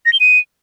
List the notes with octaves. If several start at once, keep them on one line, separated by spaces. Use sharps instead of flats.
A#6
G7
D#7